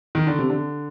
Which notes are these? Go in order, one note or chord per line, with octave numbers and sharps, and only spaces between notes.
D#3
D3
C3
D3